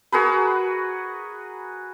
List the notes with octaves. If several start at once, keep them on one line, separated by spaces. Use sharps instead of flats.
F#4 G#4 A#4 B4